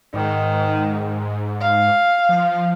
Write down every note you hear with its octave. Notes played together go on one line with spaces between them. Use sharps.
G#2 D#3
F5
F3